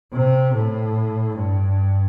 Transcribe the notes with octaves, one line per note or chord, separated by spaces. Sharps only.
C3
A2
G2